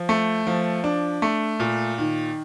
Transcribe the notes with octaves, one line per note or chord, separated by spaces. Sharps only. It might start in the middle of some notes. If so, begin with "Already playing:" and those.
Already playing: F3
A3
F3
D4
A3
A#2
D#3